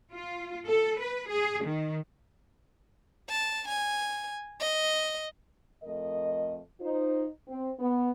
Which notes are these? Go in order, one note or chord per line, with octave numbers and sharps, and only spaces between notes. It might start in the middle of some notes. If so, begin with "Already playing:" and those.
F4
A4
B4
G#4
D#3
A5
G#5
D#5
F2 A3 A#4 D#5
D#4 F4 C5
C4
B3